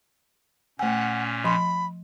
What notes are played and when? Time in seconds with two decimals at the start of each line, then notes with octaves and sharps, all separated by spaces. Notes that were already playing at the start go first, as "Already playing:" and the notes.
0.79 A#2 A3 C#4 F#5 G#5
1.44 F3 B5 C6